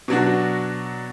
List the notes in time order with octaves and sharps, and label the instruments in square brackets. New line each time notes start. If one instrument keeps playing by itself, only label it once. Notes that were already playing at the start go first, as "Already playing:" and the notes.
[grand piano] B2 F#3 D4 F#4